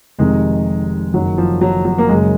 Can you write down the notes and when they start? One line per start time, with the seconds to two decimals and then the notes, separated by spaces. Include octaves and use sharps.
0.18 F1 F2 C3 D#3 G#3
1.14 F#1 F#2 D#3 F#3
1.38 F3
1.61 F#3
1.85 F#3
1.98 A#3
2.09 F#1 F#2 C#3 G#3